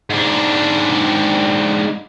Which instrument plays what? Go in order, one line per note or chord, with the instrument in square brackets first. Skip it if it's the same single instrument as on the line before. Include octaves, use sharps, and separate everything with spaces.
[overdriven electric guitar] G#2 D4